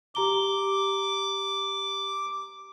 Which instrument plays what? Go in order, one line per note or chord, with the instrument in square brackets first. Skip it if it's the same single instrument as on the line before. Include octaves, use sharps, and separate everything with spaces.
[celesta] G4 A#5 G7 [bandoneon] D6